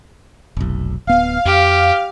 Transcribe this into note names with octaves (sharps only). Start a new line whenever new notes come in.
F1 B1
D1 B3 F5
F2 G4